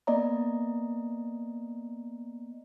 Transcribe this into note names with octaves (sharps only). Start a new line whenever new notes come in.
A#3 B3 D5 D#5 A#5